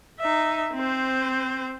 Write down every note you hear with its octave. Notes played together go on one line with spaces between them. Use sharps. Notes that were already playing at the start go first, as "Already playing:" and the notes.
D#4 E5
C4 C5